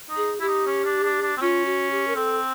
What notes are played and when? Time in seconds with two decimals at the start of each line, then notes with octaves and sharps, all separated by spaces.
0.10 D#4
0.16 G#4
0.40 E4 G4
0.48 D#4
0.67 C#4
0.85 D4
1.04 D4
1.22 D4
1.37 C4
1.41 C#4 F4
1.66 F#4
1.91 G4
2.07 A#4
2.16 C4 A4